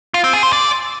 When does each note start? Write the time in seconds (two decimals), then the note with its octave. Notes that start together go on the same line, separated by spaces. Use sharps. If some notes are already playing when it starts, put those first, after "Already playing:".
0.14 F4
0.24 C4
0.33 G#4
0.43 C5
0.53 D5